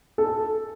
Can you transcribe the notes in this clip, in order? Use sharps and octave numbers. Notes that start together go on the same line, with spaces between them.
A4